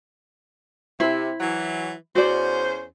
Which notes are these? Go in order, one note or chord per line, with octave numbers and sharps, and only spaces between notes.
C3 E4 C5
E3 F#3
E2 C#4 F#4 C5 D5